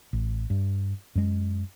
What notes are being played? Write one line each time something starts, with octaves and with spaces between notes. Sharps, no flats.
A1
G2
F#2 G#3